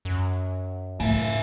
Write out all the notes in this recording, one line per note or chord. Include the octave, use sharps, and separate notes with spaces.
F#2
A2 C#3 A3 E5